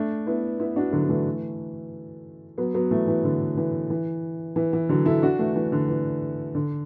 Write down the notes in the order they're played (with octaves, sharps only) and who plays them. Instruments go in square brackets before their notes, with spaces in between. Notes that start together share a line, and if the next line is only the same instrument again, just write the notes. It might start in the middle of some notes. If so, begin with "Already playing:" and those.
Already playing: [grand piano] A3 D4
B3 E4
B3 E4
D4 F#4
D3 F#3
F#3
E3 A3
F#3 B3
F#3 B3
E3 A3
E3
D3
E3
E3
E3
E3
D3 F#3
E4 A4
D4 F#4
E3 A3
E3
D3
E3
D3